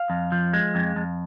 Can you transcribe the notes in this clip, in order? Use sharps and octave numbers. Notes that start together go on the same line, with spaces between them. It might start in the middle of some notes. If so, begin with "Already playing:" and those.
Already playing: F5
F2
F3
G#3
F2
F2